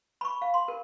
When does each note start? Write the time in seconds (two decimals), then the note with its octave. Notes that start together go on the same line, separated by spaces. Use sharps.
0.21 B5 C#6
0.42 F5
0.54 C6
0.68 A#4